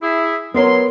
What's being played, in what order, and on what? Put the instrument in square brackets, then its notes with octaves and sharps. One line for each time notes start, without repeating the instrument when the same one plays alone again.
[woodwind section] E4 G#4 E5
[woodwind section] F#3 C6 [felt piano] B3 A#4 C#5